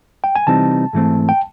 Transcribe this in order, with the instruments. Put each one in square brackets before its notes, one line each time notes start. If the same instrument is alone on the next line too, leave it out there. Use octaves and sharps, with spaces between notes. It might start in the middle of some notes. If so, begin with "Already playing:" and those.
[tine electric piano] G5
G#5
[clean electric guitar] C3 E3 G3 C4 D#4 [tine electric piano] A5
[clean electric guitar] G#2 E3 A3 C4
[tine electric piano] G5